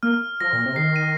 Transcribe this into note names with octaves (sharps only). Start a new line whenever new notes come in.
A#3 F6
F3 A#6
A#2
C3
D#3 C7
D#7